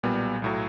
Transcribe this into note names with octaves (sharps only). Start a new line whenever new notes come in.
B1 A#2 G3 B3
B1 A2 F#3